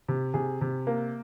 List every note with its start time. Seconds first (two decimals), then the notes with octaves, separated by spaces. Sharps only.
0.08 C3
0.34 C3 G#4
0.61 C3
0.87 A#3